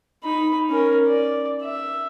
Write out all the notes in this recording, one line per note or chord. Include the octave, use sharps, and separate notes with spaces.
D#4 B5
C#4 A#4
D5
E5